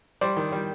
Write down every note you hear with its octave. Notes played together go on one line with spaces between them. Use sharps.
G3 C5 D5
D#3
G3